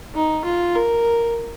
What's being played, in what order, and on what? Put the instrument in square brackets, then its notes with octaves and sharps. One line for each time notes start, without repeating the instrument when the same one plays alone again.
[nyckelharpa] D#4
F4
A#4